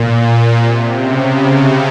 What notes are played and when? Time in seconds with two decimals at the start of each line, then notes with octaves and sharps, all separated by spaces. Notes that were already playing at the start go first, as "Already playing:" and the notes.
Already playing: A#2
0.56 C3
0.93 C#3